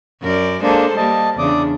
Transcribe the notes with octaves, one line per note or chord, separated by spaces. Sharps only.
F#2 A#4 D5
G#3 A#3 D4 A4 C5
G3 A#3 D#5 A5
E2 C#3 D4 D5 D6 D#6